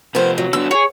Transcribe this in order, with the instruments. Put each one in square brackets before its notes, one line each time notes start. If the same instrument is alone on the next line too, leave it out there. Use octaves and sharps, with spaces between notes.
[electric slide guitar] C3 F3 C4 [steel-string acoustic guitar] B3 A#4 C5
[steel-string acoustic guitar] F#3
[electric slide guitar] D3 B3 D4 [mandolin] E6
[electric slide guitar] F#4 G#4 [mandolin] C#5